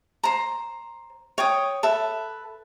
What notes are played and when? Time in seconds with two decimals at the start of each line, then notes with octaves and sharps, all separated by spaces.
0.23 C5 A#5
1.38 C#5 G5 D#6
1.83 A4 B4 E5